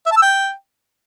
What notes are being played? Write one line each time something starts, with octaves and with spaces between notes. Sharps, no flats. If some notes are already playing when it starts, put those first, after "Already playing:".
E5
A5
E6
G5